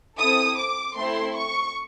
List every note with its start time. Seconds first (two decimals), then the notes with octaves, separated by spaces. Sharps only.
0.18 C4 E4 A4 D#6
0.57 D6
0.95 A3 C4 E4 C6
1.34 C#6